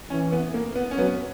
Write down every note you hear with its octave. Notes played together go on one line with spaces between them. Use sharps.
E3 C#4
B3
A#3
B3
C#4
F#3 B3